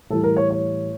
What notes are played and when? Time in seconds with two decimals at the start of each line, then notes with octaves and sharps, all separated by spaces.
0.10 A2 E3 G3 A4
0.24 A#4
0.37 C#5
0.50 C#5